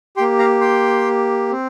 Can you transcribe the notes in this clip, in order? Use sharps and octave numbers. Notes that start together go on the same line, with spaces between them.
A#3 G4 G5 C6
F5 A#5
G5 C6
C4